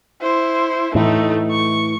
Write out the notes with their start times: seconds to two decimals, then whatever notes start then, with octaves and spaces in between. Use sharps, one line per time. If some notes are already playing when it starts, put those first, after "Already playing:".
0.21 E4 C5
0.95 A2 E3 A3 D#4
1.51 C#6